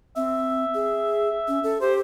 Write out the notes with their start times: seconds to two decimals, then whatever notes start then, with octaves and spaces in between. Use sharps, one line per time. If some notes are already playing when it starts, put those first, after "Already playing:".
0.16 C4 E5
0.75 G#4
1.48 C#4
1.63 A4
1.81 G4 C5